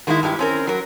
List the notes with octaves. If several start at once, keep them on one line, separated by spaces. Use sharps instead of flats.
D#3 G#3 A#3 D4 E4
G2 G#3 E4 G4
C4 C#4 A#4
F#3 A#4